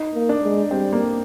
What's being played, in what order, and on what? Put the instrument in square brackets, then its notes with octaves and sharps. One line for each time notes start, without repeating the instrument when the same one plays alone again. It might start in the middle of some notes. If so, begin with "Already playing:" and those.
Already playing: [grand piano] D#4
[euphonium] A#3
[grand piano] D4
[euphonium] G#3
[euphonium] G3 [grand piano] C4
[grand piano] A#3